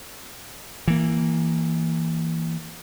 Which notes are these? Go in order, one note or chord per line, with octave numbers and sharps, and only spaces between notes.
E3 A#3